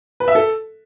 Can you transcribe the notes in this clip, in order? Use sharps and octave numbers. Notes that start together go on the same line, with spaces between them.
B4
E5
A4